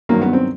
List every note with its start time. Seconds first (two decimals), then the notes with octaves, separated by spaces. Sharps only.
0.09 G2 D#3 F#3 A#3
0.22 B3
0.33 C4